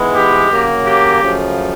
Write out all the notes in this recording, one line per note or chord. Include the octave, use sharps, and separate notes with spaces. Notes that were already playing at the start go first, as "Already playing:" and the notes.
Already playing: G#2 E3 G#3 B3
G4
C#3 F#3 A#3
G4
F#2 C#3 F3 A3